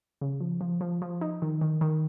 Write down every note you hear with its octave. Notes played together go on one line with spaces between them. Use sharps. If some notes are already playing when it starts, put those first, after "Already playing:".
C#3
F3
F3
F3
F3
D#4
D#3
D#3
D#3